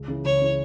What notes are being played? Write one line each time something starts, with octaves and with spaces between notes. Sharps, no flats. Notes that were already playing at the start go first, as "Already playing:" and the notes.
Already playing: C#2
C#3 E3
C#2 C#5
C#3 E3